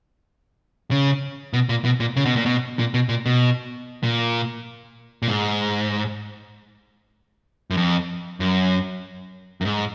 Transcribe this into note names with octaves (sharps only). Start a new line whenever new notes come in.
C#3
B2
A#2
B2
A#2
C#3
B2
A#2
B2
A#2
B2
A#2
B2
A#2
A#2
G#2
F#2
F2
F#2
F#2
G#2